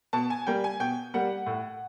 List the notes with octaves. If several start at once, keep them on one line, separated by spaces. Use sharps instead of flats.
B2 A5
G#5
G3 A#3 G5
G#5
B2 G5
G3 A#3 F#5
A2